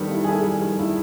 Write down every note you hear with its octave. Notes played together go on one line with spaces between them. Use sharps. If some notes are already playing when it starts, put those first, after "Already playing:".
Already playing: D#3 G3 B3 A4
E4
G#4
E4 A4
G3
D#3
E4